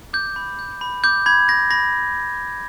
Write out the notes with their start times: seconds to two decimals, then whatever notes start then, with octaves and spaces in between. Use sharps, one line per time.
0.13 D6 G6
0.36 B5
0.59 G6
0.81 B5
1.04 D6 G6
1.26 B5 G#6
1.48 G6 A#6
1.71 B5 A#6